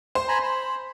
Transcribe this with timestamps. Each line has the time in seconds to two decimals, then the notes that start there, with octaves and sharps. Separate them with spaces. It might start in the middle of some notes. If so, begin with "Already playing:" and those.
0.15 C5
0.28 G#5 A#5 B5
0.43 B5